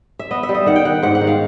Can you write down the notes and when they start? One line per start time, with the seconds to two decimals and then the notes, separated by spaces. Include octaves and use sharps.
0.19 E5
0.31 B3 D#5
0.43 E5
0.49 G3
0.55 D#5
0.66 D#3 F#5
0.76 G5
0.85 D#3 F#5
1.03 G#2 F#5
1.15 F#5
1.21 D#3
1.27 F5